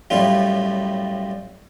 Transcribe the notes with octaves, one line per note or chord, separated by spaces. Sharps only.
F#2 A2 G3 F4